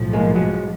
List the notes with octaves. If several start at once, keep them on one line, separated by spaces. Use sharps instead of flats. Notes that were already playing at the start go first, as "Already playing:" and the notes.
Already playing: B1 A2 F3
G#3 A#3
F#3 G#3